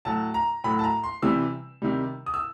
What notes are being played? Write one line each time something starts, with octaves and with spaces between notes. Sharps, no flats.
A2 F#3 A5
A#5
A2 F#3 B5
A5
A#5
C6
C3 E3 G3 E6
C3 D#3 G3
D#6
E6